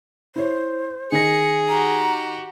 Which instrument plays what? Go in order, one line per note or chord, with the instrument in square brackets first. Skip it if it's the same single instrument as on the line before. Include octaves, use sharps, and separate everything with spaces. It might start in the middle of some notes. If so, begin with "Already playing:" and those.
[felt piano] E4 C#5 [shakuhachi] C5
[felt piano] D#3 A#6 [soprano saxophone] G#4 [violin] C#7
[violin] F#4 G4 [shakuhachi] A#5